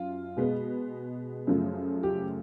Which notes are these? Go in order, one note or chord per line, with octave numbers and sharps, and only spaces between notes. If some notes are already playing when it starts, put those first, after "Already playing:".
Already playing: F#2 F4
B2 G#3 B3
F#2 C#3 F3 A3
G4